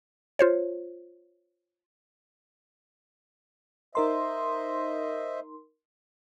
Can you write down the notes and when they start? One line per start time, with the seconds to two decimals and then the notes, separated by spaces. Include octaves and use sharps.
0.39 F4 C5 C#5
3.95 D#4 A#4 C5 D#5 E5 C6